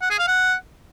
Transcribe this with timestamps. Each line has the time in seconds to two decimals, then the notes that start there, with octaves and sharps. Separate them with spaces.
0.02 F#5
0.10 G#4
0.19 F5
0.27 F#5